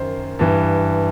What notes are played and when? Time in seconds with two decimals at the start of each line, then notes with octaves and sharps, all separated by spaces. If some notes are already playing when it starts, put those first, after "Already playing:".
Already playing: F#2 D#3 C5
0.39 G2 E3